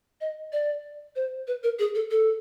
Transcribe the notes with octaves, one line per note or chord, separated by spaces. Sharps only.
D#5
D5
C5
B4
A#4
G#4
A4
A4